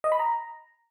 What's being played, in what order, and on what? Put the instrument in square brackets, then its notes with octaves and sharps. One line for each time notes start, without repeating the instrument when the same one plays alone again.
[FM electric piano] D#5
B5
A#5